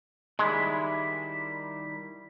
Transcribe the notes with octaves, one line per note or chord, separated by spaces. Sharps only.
D#3 G3 G#3 E4